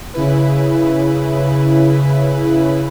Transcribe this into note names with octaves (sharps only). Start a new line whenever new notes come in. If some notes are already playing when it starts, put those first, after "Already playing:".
C#3 E4 B4